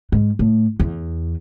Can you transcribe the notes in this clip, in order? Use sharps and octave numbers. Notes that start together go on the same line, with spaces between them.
G#2
A2
E2